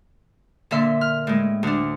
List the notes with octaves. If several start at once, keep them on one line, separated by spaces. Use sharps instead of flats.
A#2 D3 E5 C6
F6
A2 G#3
D2 D4